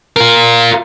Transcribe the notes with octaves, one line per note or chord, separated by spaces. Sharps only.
F4 A#4